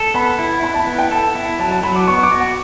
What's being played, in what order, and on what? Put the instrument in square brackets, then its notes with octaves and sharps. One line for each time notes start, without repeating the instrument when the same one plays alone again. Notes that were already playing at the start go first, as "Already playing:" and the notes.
Already playing: [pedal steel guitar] A4
[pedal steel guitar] B3 [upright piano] B5
[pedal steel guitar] E4
[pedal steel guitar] E4 [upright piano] B5
[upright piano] A5
[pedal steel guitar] B3
[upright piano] G5
[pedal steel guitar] A4 [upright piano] A5
[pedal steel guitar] E4
[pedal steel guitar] F#3 [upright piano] A5
[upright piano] A5
[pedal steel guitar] F#3 [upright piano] B5
[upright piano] D6
[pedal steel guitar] B3 [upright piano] C#6
[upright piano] D6
[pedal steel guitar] F#4
[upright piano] F#5